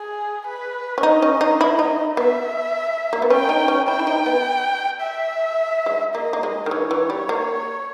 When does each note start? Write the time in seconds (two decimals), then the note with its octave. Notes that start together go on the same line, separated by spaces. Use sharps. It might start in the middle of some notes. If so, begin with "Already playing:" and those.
Already playing: G#4
0.47 B4
0.98 C#4
1.03 D#4 D#5
1.22 C#4
1.41 D#4
1.61 E4
1.79 D#4
2.17 B3 E5
3.13 A#3
3.22 B3
3.30 C#4 G5
3.49 D#4
3.68 C#4
3.88 E4 G5
3.99 E4
4.07 D#4
4.26 B3
5.01 E5
5.86 G#3
6.15 A#3 D#5
6.33 A#3
6.43 G#3
6.66 D#3
6.71 E3 C#5
6.91 E3
7.10 G3
7.29 A#3